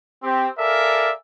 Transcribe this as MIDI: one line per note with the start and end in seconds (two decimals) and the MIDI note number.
0.23 0.48 60
0.23 0.48 67
0.58 1.11 69
0.58 1.11 70
0.58 1.11 74
0.58 1.11 76
0.58 1.11 77
0.58 1.11 80